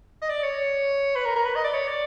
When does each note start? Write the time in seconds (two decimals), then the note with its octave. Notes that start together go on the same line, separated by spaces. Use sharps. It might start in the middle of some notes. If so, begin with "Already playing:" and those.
0.22 D#5
0.29 D5
0.43 C#5
1.16 B4
1.25 A#4
1.35 A#4
1.45 B4
1.55 D#5
1.64 D5
1.74 C#5
1.88 D5